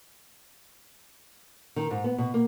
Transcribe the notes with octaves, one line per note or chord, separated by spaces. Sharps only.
D#3
G#2
B3
B2
A#3